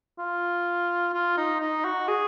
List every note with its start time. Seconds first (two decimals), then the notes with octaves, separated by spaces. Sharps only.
0.18 F4
1.14 F4
1.37 D#4
1.60 D#4
1.85 F#4
2.08 G#4